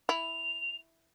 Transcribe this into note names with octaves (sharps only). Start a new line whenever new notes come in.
E4 F7